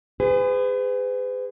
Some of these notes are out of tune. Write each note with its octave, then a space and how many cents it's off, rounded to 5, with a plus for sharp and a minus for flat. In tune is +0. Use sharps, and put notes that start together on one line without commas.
G#4 -25 B4 +40